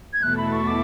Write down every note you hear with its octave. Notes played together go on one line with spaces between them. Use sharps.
G#6
E2 B2 A3 E4 A4 F#6
B5
C#6
D6